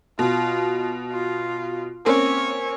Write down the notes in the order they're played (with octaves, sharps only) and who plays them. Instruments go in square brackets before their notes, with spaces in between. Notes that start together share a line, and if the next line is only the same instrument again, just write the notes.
[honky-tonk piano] B2 [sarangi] F4
[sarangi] F4
[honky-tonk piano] A#3 C4 C#4 [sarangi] C#5